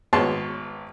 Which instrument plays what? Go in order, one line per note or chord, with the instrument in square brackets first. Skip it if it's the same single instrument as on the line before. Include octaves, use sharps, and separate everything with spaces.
[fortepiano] G#1 B3 C#5 A5 C6